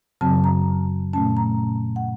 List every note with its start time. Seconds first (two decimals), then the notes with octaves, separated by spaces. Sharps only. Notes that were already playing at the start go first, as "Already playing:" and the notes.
0.21 F#2 C#3 F#3 C4 A5
0.44 A#5
1.13 A#2 A3 C#4 A5
1.37 A#5
1.96 F#5